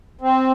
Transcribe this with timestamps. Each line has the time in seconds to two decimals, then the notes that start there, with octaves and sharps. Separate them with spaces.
0.21 C4